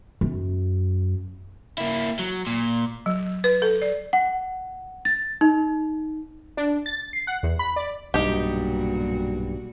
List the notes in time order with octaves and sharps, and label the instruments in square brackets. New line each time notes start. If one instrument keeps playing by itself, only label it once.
[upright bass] F#2
[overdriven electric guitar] A#3 E4
F#3
A#2
[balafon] F#3
B4
A4
D5
[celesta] F#5
A6
D#4
[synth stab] D4
A6
C7
F#5
E2
B5
D5
[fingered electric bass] B1 G2 [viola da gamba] A#2 G3 F#4 [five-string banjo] D#4 G4